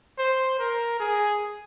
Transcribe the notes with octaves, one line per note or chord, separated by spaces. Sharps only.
C5
A#4
G#4